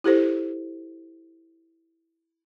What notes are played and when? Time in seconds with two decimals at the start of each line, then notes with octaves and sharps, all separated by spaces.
0.04 E4 G4 A4 C5